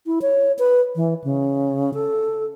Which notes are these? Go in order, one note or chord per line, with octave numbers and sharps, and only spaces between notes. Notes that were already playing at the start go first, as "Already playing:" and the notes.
E4
C#5
B4
E3
C#3
A4